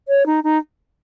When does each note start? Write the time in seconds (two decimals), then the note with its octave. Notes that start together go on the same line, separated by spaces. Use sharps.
0.08 C#5
0.26 D#4
0.44 D#4